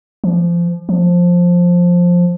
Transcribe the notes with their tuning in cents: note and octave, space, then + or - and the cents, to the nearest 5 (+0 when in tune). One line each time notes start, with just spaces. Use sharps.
F3 -25
F3 +10